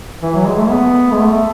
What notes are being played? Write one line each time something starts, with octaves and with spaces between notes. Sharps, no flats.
E3
F#3
G#3
A3
B3
G#3
A3